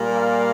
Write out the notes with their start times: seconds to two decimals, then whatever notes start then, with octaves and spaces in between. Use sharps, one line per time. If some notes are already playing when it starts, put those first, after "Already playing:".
Already playing: A#2 G3 A#3
0.15 D5 F5